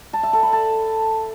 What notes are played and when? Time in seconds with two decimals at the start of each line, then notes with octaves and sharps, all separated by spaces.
0.13 A5
0.23 E5
0.33 A4
0.43 B5
0.53 A5